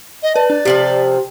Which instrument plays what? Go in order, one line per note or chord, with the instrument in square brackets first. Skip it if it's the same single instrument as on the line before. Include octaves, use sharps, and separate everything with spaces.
[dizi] D#5
[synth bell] B4 D5 [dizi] A5
[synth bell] D4 [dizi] D5
[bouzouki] C3 F3 A4 [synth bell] G4 F#7